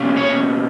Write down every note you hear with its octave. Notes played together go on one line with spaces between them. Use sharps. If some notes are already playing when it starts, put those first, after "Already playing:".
Already playing: B2 A#3 C#4
C#5